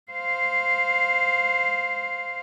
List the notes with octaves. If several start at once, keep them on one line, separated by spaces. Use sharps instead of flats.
C5 F5